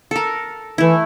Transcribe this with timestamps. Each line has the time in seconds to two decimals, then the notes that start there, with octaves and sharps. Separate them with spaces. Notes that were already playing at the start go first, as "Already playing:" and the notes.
0.11 A4 A#4
0.78 E3 A3 E4